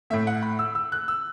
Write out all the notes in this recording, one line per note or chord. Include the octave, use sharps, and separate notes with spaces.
A2 A3 E5
F#5
B5
E6
E6
F#6
E6